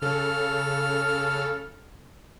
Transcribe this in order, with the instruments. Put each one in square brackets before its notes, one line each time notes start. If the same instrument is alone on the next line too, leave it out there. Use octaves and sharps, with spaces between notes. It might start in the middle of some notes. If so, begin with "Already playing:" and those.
[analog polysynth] C#3 A4 [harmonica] F6